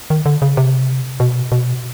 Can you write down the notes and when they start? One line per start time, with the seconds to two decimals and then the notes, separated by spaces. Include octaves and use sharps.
0.10 D#3
0.26 D3
0.42 C#3
0.57 C3
1.20 B2
1.52 B2